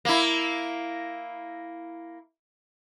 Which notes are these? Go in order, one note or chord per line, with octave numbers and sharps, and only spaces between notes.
A#3 E4